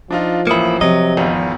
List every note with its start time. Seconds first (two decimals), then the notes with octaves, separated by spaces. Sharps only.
0.11 F3 D4 D#4 F4
0.47 A1 A#3 E4 D#6 C#7
0.81 C3 F3 F#3 C4 D#5
1.17 G#1 E2 F4